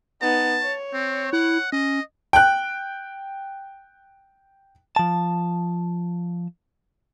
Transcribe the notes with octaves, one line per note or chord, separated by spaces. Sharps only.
B3 D#4 A5
C#5
C4
E4 F#5
C#4 D#5
G5 F#6
F3 A5